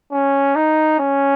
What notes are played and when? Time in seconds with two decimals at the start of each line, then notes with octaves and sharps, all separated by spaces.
0.12 C#4
0.55 D#4
0.99 C#4